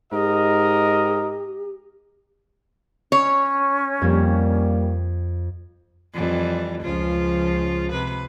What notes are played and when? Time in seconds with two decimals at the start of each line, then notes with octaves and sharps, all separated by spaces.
0.12 G#2 G4 A#4 D#5
3.12 C#4 C#5
4.01 F2 G3 A#3 G#6
6.14 F2 E3 G3
6.83 C#2 C#3 F3 F4
7.92 C3 B4